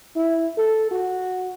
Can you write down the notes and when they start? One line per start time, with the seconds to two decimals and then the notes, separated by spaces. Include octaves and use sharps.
0.16 E4
0.58 A4
0.91 F#4